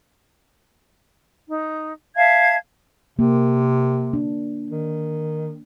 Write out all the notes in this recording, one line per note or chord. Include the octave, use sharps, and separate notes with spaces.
D#4
E5 F5 A5 G#6
C3 A#3
D4
D#3